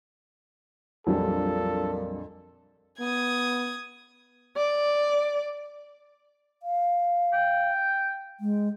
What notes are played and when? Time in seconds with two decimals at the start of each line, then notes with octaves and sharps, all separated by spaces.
1.07 A#1 F2 A#2 F#3 G3 D4 A4
3.00 B3 D#6 G#6
4.57 D5
6.63 F5
7.33 G5
8.40 G#3